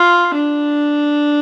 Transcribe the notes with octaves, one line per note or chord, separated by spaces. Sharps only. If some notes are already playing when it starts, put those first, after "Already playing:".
Already playing: F4
D4